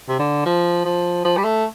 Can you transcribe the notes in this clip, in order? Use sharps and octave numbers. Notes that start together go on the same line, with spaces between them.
C3
D3
F3
F3
F3
G3
A3